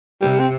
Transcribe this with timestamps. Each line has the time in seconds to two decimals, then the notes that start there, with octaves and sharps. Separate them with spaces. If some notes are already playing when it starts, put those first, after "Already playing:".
0.21 C3 G3
0.39 C4